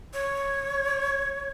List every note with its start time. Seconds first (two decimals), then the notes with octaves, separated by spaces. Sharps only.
0.14 C#5